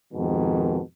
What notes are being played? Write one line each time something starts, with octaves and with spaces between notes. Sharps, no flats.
F2 G#2 B2 D#3